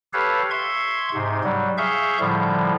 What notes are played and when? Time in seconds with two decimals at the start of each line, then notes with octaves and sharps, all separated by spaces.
0.13 G4 A4 B4 C#5 F5
0.51 E5 C6 C#6 G#6
1.14 G#2 C3
1.44 F#3 G3
1.78 G#4 E5 F5 C#6 G6
2.20 A2 D3 F3 G3